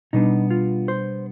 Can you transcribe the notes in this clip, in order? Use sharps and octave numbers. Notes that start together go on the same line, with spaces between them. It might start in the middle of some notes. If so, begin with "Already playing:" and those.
B2 G3 B3 D4 D#4
F4
C5